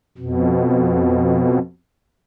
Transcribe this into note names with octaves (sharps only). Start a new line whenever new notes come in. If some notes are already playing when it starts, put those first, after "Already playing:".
F2 B2